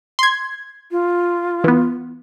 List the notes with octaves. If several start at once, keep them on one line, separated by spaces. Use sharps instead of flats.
C6 G#6
F4
E3 B3